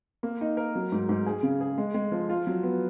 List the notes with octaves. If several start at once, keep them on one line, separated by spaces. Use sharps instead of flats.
A#3
D#4
A#4
F#3
G#2
G#2
G#4
C#3
G#4
G#3
G#3
F3
F4
F#3
B3